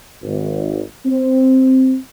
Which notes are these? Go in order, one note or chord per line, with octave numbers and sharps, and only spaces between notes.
G#1
C4